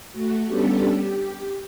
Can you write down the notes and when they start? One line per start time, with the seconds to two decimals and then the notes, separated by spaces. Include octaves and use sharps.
0.12 A3 F#4
0.46 G3 B3 C#4 D4 G4 A4
0.95 G4